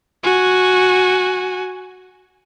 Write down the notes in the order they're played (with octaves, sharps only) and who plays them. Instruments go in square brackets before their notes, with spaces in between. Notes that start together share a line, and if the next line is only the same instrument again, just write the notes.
[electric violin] F#4 G#5